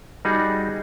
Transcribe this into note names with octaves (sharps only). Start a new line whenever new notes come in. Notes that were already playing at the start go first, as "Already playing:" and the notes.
G3 D#4 F#4 G#4